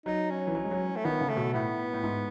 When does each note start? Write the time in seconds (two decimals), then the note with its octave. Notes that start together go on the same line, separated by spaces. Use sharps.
0.06 F#3 D#4
0.30 C#4
0.47 E3
0.55 F#3
0.64 G#3
0.71 F#3
0.96 A3
1.05 D#3 B3
1.21 C#3
1.29 A3
1.37 B2
1.53 A2 B3
1.93 A2
2.04 G#2